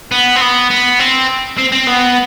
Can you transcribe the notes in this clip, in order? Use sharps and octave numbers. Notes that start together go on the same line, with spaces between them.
B3
C4
B3
B3
C4
C4
C4
B3